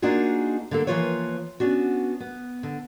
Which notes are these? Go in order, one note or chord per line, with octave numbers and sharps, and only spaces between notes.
A#3 D4 D#4 F4 F#4 G#4
D3 A#3 A4
E3 F3 A#3 F4 B4 C#5
B3 C#4 D4 F#4
B3
D3